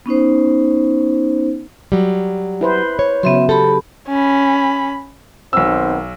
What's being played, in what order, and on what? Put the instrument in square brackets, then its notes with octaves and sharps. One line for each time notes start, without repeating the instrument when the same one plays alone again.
[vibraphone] B3 C#4 D#4 C5
[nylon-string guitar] F#3 G3
[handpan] E4 B4 C5
[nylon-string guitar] C#5
[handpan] C#3 F#3 [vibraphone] B3 E5 C6
[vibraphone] G4 A5 B5 [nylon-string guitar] A4
[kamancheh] C#4 B5
[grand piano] B1 E6 [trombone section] D#3 B3 C4